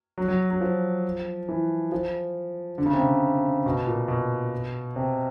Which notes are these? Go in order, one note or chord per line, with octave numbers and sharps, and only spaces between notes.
F#3
F#3
F#3
F3
E3
F3
D3
C#3
C3
C#3
B2
A#2
B2
C3